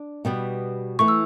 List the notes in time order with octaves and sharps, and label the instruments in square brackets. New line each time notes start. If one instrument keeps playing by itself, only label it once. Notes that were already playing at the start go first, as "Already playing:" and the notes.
Already playing: [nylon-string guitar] D4
B2 G3 B3
[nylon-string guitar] E3 A3 [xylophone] C#6
[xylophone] E6